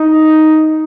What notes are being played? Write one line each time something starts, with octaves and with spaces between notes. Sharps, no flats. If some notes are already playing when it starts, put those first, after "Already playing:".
Already playing: D#4